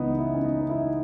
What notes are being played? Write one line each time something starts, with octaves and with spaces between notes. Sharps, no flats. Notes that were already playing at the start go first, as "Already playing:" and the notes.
Already playing: C#2 C#3 E3 B3 D#4
E4
C#4
D#4
E4